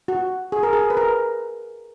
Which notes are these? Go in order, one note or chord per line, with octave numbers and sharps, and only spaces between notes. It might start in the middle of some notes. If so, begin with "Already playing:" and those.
F#4
G#4
A#4
G#4
B4
A#4